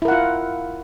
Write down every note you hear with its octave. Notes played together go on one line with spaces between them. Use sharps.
E4 F4 A#4 F#5